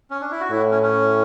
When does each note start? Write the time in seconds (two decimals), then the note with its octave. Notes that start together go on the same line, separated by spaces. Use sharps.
0.10 C#4
0.21 D4
0.31 E4
0.41 F#4
0.51 A2 E4
0.71 C#4
0.83 C#4